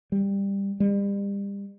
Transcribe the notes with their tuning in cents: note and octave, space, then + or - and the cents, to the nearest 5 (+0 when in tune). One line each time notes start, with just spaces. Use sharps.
G3 +15
G3 +35